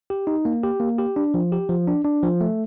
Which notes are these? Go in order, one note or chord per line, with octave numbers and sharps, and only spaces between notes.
G4
D#4
A#3
G4
A#3
G4
D4
F3
G4
F3
D4
D4
F3
A3